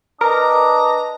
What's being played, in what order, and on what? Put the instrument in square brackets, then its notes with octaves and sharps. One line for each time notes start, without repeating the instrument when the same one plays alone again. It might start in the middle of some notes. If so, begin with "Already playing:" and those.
[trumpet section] D4 D#6 [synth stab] A#4 [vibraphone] B4 D#5 [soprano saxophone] A#5